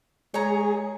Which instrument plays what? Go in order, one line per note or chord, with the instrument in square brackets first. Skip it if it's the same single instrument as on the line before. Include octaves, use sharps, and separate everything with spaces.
[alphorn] G#3 [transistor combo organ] G#4 [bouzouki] C#5 A#5